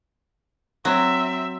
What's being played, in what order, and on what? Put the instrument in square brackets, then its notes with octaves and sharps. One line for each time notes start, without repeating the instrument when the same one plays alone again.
[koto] F#3 [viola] C4 E5